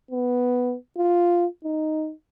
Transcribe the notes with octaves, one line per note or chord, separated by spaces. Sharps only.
B3
F4
D#4